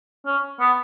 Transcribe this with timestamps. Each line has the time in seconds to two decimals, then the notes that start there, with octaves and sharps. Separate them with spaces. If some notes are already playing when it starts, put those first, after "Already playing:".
0.26 C#4
0.60 B3